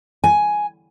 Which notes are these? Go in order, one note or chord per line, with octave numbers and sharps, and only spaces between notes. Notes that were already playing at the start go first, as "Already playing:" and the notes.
G#5